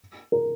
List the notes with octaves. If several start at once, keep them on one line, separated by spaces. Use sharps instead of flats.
A#4